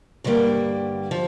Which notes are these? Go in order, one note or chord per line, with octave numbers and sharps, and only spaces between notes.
G2 D3 G3 A#3
F3